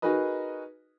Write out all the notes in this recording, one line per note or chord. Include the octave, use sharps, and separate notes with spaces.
D#4 F#4 G#4 A#4 B4 D#5